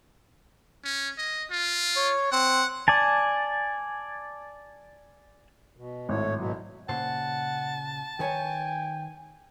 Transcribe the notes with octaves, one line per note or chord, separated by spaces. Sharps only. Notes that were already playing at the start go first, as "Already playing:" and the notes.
C#4
D#5
F4
C#5
C4 F#5
D5 G#5 A5
B2
G#1 A2 A3 C#5
B2 F#3
A#2 C#3 C5 F#5 A5
D#3 B4 C#5 G5 G#5